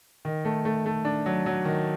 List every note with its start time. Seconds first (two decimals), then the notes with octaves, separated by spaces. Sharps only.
0.25 D#3
0.45 A3
0.65 A3
0.86 A3
1.05 D4
1.26 F#3
1.46 F#3
1.65 D#3